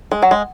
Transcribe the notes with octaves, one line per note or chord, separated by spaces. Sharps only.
G#3
F#3
G#3